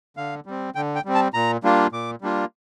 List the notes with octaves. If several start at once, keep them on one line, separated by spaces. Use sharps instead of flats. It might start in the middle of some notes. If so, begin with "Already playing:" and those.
D3 F5
G3 C4
D3 G5
G5
G3 C4
A5
A#2 A#5
G3 A#3 D4 F4
A#2 D6
G3 A#3 D4 F4